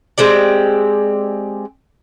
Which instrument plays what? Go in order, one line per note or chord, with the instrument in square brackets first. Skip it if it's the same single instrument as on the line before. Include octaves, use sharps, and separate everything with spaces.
[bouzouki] G#3 C4 G4 D5